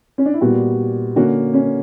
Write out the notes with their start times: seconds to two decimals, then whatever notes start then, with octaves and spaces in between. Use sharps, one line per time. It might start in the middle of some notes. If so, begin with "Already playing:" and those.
0.18 C#4
0.25 D4
0.34 E4
0.41 A#2 G3 B3 F#4
1.16 D3 A#3 C#4 F#4
1.54 C#4